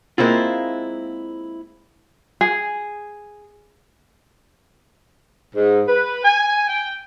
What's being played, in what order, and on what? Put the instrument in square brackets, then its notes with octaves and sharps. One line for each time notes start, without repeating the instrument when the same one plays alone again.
[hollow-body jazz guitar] G#3 A#3 C4 E4 F4
[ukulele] G#4
[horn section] G#2
B4
G#5
G5